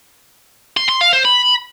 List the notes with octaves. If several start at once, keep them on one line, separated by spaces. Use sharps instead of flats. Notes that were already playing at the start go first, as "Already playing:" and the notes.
C6
C6
F5
C5
B5